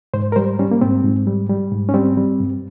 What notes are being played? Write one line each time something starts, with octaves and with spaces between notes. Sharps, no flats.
G#2 C5
A#4
G3 C5
G3 C#4
A#3
G#2 C4
G#2
G3
G3
G#2
C#4
G3 C4
G3
G2